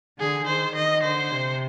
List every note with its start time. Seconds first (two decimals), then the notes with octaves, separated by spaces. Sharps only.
0.19 D3 G#4
0.46 D#3 C5
0.75 D#3 D#5
1.03 D3 C5
1.31 C3